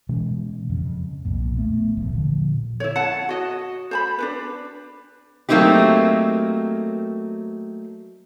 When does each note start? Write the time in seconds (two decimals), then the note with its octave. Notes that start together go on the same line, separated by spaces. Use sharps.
0.09 B2 E3 G#3 C#4
0.69 F2 C#3
1.25 B1 F2 A#2
1.57 A3 B3
1.97 D#1 A#1 A2 F3
2.13 A#2 D3 F3
2.80 E4 C#5
2.96 F#5 A5
3.29 F#4 D#5
3.91 C5 A5 B5
4.18 D4 F#4 B4
5.49 F#3 A3 A#3 C4 D#4 G4